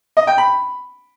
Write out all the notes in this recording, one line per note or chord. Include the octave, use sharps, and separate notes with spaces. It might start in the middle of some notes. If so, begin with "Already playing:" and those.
D#5
G5
B5